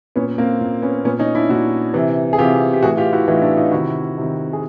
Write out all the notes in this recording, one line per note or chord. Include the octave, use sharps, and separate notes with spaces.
A#2 B3 C#4
A#3 C4
A#2
B3 C#4
A#2 B3 C#4
C#4 D#4
D4 E4
A#2 E4 F#4
C3 E3
G#4
C3 E3 F4 G4
G4
A2 E3 F#4 G#4
F4 G4
E4 F#4
A2 E3 D#4 F4
D4 E4
D#4 F4
C3 D#3 E4 F#4
C3 D#3
G#4